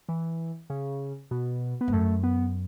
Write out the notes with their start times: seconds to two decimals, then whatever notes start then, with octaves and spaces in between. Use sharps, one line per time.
0.08 E3
0.70 C#3
1.31 B2
1.81 B3
1.88 G#2
1.93 F#2 A3
2.23 B3